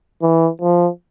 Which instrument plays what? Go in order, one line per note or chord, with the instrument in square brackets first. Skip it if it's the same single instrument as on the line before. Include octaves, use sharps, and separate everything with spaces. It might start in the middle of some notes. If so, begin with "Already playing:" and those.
[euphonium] E3
F3